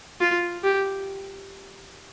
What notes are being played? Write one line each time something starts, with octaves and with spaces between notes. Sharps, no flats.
F4
G4